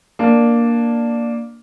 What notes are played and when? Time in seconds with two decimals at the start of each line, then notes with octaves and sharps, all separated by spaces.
0.19 A#3 D4